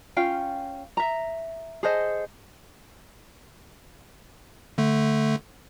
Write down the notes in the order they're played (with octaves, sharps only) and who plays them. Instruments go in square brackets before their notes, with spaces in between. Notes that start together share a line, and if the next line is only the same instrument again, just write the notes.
[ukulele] C#4 F4 F5 G5
E5 A#5
G#4 A4 C5 D#5
[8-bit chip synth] D3 A3